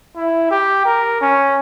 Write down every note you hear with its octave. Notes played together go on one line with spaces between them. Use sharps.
E4
G4
A#4
C#4